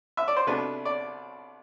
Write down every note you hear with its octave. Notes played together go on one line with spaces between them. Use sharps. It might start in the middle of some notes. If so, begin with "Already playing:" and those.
E5
D5
C5
C2 B2 A3 D4 B4
D5